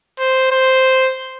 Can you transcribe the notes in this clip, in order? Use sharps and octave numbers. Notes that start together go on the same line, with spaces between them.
C5
C5